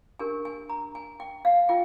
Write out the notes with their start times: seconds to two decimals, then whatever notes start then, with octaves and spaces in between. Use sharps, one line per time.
0.19 D4 G4 A#4 G#5
0.45 G#5
0.70 A#5
0.95 G#5
1.20 G5
1.45 F5
1.69 F4 G5